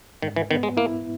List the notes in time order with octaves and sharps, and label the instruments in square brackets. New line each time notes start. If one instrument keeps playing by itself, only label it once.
[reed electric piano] G#2 [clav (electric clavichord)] D#3
[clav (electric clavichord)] E3
[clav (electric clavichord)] D#3 [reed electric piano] B3
[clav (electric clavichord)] G#3
[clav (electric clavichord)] A#3 [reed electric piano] E4